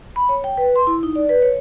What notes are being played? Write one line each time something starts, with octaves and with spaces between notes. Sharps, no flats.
B5
C#5
G5
B4
C6
E4
D#4
D5
B4
C#5